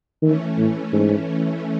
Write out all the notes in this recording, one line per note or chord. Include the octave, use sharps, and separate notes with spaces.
D#3 E3 A3 C#4
A2
G#2